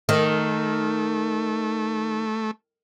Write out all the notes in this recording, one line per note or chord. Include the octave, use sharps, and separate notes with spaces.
D#3 A3